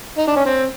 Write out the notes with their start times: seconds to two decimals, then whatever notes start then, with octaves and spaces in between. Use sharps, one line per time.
0.18 D#4
0.27 D4
0.36 C#4
0.46 C4